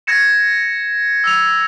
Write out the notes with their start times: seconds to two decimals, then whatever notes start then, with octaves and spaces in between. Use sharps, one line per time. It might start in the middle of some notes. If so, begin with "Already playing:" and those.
0.07 G#6 A#6 C#7 E7
1.24 E6 F7